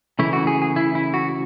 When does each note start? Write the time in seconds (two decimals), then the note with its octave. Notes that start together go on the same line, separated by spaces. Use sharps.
0.19 C#3 E3 A3 E4
0.33 F#4
0.47 G#4
0.62 G#4
0.76 E4
0.95 E4
1.14 F#4